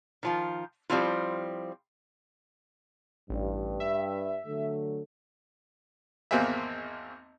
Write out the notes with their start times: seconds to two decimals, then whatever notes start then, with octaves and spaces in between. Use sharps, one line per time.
0.23 D#3 F3 F4
0.90 F3 G3 A3 C4 E4 F4
3.29 A1 G2
3.80 E5
4.46 D3 F#3 A3
6.31 G#1 E2 A#3 C4 G#4 E5